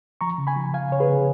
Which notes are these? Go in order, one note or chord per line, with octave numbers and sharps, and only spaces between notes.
F3 A#5 C#6
C#3
G#5 B5
F3
F3 F5 G#5
C#3 C#5
G#4 B4
C#3